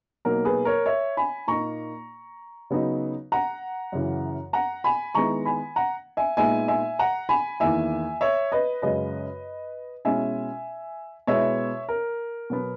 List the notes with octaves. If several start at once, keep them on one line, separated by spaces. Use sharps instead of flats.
B2 F#3 A#3 D#4 A#4
G#4 B4
A#4 C#5
C#5 E5
G#5 B5
A#2 A#3 D#4 A#5 C#6
C#3 F#3 B3 D#4
F#5 A#5
F#2 C#3 E3
F#5 A#5
G#5 B5
D#3 G#3 B3 E4 A#5 C#6
G#5 B5
F#5 A#5
E5 G#5
A#2 G#3 B3 D#4 E5 G#5
E5 G#5
F#5 A#5
G#5 B5
E2 D#3 A#3 E4 E5 G#5
C#5 E5
B4 D#5
F#2 C#3 G#3 B4 D#5
B2 G#3 C#4 E4 E5 G#5
B2 G#3 B3 E4 C#5 E5
A#4
B2 F#3 B3